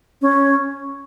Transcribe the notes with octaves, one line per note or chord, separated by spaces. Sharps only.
C#4